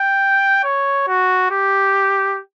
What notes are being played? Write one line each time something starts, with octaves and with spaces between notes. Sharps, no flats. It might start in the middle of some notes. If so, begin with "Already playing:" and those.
Already playing: G5
C#5
F#4
G4